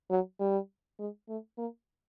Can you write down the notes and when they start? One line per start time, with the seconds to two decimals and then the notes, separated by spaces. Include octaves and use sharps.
0.10 F#3
0.40 G3
0.99 G#3
1.29 A3
1.58 A#3